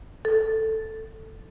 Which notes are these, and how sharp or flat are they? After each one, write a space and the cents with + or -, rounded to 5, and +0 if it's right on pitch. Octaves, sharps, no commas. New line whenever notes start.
A4 +5